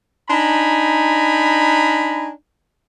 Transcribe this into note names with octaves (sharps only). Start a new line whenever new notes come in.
D4 D#4 G#5 A#5 B5